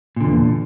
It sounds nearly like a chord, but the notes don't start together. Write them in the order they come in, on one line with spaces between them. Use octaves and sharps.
A#2 D3 E2